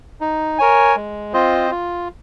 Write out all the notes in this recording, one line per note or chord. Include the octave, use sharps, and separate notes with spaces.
D#4
A#4 C#5 G#5
G#3
C4 F4 C5 D#5
F4